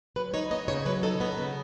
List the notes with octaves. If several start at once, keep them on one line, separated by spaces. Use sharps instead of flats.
F#3 B4
D#4 C#5
B3 D#5
C#3 C#5
F#3 B4
D#4 A4
B3 C#5
C#3 B4